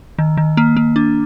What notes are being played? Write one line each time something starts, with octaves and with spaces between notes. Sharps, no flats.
D#3
D#3
A#3
A#3
D4